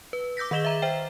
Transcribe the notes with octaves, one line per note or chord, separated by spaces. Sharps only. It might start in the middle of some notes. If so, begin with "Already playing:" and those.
B4
D6 E6 G6 A#6 B6
D#3 G#4 D#5 E7 G7
E5 A#5 E7
C5 E5 G5